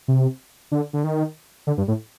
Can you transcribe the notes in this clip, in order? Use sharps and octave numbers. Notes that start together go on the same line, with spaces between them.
C3
D3
D3
D#3
D3
G2
A2